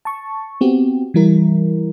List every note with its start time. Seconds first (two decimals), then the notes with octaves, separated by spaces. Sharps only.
0.05 A5 C#6
0.61 B3 C4 F#4 G4
1.14 E3 G3 E4 A#4